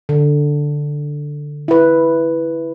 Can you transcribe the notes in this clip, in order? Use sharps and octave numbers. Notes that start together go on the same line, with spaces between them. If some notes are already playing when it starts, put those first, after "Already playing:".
D3
E4 B4